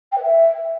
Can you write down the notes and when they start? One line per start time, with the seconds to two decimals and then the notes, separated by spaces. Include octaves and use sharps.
0.11 G5
0.17 B4
0.23 E5